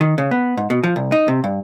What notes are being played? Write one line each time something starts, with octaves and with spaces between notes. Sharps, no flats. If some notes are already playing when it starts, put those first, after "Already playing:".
D#3
C#3
B3
G#2
B2
F3
C2
D#4
C3
G2